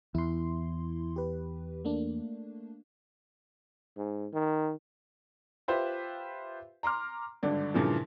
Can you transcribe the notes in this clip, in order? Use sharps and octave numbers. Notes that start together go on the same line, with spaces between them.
E2 E4 C6
G4 B4
A3 A#3 D4
G#2
D#3
F4 G4 B4 C5 E5 F5
A#5 C6 D6 F6
G#1 G2 D3 D5
G2 A#2 C#3 E3 F3